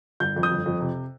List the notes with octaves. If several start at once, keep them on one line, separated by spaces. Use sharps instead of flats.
G1 G6
F2
D#6 G6
G1
F2
C3